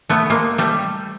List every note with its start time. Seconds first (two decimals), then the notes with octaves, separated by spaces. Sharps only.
0.09 A3 B3
0.30 G#3 A#3
0.58 G3 A3